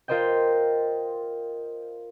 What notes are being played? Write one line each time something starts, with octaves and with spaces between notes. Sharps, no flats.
F4 A#4 C5 D#5 G5